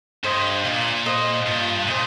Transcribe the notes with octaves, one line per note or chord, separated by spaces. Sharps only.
G2 C5 D#5
A#2 F4
C5 D#5
G2 F4
A#2 C5 D#5